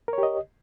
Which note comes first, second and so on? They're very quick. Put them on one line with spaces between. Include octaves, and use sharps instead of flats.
A#4 C#5 G4 D#5